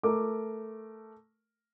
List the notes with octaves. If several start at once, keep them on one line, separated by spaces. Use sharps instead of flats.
A3 A#4 D6